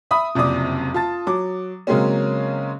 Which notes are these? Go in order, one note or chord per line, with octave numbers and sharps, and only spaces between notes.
E5 B5 D#6
F#1 F2 C3 D5 D6 D#6
F4 A5 A6
F#3 D6
C#3 F#3 G#3 A#3 C4 C#4